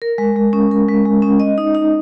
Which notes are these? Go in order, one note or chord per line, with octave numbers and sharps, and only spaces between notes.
A#4
G#3
G#3
C#4
A#4
G#3
G#3
C#4
D#5
D#4
D#4